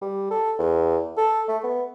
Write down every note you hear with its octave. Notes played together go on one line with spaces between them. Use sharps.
G3
A4
E2
A4
A3
B3